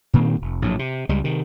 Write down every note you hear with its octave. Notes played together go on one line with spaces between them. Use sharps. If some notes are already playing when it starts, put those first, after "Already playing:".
A#2 D#3 A#3 C4
F1
A#1 A2 F#3
C3
C#2 G3 G#3
C3 D#3